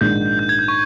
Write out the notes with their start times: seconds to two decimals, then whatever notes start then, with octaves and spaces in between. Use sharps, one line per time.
0.01 A#1 G#2 D#3 G#3 D#4 G6
0.39 G6
0.49 G#6
0.59 G6
0.68 C#6